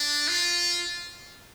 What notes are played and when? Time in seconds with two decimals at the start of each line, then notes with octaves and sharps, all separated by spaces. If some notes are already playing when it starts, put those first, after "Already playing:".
Already playing: D4
0.28 F4